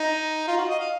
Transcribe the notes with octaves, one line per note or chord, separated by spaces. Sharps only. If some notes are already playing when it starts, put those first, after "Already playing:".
Already playing: D#4
F4
F#4
D#5
F5